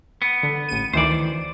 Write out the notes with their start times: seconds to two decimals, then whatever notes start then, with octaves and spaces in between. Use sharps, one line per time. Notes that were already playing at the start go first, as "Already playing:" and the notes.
0.22 B3
0.43 D3
0.69 A1 D#7
0.93 D2 D#3 E3 C5 D5